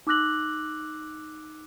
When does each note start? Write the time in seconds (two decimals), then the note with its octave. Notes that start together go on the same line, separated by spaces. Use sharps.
0.07 D#4 D6 E6 F#6 A#6 F#7